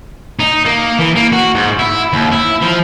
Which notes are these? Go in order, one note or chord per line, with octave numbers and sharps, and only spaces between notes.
D#4
A#3
E3
A#3
F#4
G#2
E4
D#2
E4
F3